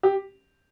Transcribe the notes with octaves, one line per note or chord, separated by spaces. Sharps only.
G4